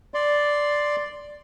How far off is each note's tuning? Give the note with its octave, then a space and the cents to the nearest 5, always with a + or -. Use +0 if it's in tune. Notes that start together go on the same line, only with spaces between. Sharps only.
D5 +0 C6 +0